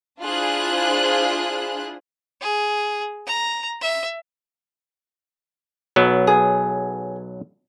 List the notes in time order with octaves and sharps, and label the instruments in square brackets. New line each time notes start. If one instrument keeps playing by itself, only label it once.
[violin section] D4 E4 F4 G#4 C5 F#6
[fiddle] G#4
A#5
E5
[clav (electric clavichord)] B1 F#3 B3
[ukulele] G#4